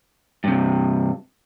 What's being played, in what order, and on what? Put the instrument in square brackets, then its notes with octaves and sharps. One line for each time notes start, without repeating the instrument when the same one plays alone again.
[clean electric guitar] G2 C3